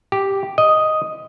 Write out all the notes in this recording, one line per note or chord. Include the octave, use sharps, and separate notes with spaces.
G4
D#5